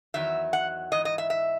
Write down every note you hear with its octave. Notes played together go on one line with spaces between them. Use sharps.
E2 D#3 F#3 E5
F#5
G#2 E3 D#5
D#5
E5
E5